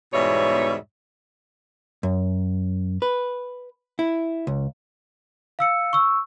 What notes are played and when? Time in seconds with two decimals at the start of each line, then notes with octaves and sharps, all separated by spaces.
0.14 E2 G#2 B2 G3 C#5 E5
2.03 F#2
3.02 B4
3.99 E4
4.47 C#2
5.59 F5 E6 C#7
5.93 C#6 E6